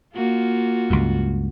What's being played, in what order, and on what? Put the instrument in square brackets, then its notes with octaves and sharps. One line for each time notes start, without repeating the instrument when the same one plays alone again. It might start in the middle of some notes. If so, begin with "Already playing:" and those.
[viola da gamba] A#3 F4 F#4
[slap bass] C#2 G2